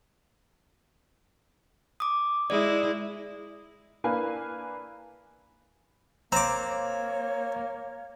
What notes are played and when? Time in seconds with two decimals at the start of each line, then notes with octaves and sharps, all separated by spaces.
2.00 D6 D#6
2.50 G#3 E4 D5
4.04 A#3 D4 E4 B4 F5 G#5
6.32 A#3 C4 C#5 A#5 D6